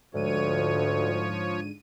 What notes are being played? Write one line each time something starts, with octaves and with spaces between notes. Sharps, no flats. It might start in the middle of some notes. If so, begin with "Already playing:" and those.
D2 G#2 D3 F3 C#5 D#7